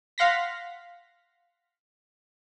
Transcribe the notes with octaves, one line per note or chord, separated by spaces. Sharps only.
F5 F#5 C6 A#6 B6